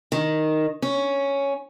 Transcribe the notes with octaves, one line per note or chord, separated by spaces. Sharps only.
D#3
C#4